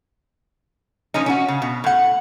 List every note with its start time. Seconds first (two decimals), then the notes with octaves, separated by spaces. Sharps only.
1.14 F3 A#3 C#4 D#4
1.26 C#4 D#4 F#4
1.48 C#3
1.62 B2
1.84 A2 F#5